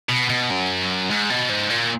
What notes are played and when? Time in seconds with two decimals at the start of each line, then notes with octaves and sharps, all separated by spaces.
0.09 B2
0.30 B2
0.50 F#2
1.11 G#2
1.30 B2
1.49 G#2
1.70 A#2